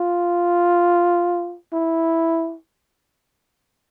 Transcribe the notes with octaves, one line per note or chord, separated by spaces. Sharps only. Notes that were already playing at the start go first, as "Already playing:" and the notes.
Already playing: F4
E4